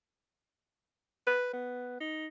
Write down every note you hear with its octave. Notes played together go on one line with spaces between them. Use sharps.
B4
B3
D#4